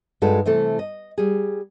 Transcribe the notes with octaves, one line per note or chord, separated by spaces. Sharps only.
G2 G#3 D#4 F#4 A4
C3 E3 A3 A4
D#5
G3 G#4